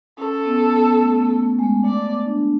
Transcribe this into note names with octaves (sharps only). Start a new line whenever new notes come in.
C#4 A4
B3
B3
A3
B3
A3
A3
G#3
A3
A3 D5
B3
D4